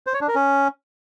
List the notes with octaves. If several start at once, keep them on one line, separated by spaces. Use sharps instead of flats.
C5
C#5
D4
A#4
C#4